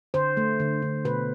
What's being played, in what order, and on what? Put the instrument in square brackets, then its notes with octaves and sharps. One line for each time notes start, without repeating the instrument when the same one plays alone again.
[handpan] D3 C5
A3
D3
D3
B2 B4